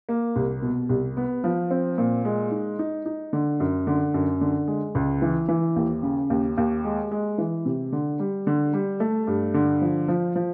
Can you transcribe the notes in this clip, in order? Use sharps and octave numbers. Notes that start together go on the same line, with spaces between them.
A#3
C2
B2
C2
B3
F3
C4
A#2
G#3
D#4
D#4
D#4
D3
F#2
D3
F#2
D3
G#3
C#2
E3
E3
D#2
C#3
D#2
D#2
G#3
G#3
E3
C3
D3
G3
D3
G3
A3
G2
D3
F3
F3
F3